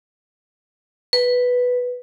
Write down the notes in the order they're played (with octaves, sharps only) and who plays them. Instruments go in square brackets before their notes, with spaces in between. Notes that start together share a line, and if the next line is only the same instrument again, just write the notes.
[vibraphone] B4